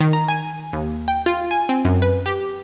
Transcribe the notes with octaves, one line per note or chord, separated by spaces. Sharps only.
D#3
A#5
G#5
D#2
G5
F4
G#5
C4
F#2
B4
G4